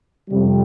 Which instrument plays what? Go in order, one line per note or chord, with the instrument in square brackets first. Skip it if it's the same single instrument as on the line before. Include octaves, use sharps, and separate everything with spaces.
[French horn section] F2 C3 G3